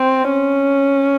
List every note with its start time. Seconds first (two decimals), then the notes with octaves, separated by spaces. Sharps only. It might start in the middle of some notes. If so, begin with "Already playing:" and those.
Already playing: C4
0.31 C#4